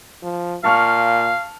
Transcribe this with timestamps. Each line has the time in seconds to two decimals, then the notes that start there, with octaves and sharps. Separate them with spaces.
0.23 F3
0.64 A#2 F5 A5 C#6 F6